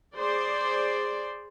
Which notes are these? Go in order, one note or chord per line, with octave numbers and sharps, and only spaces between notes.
G#4 C5 D5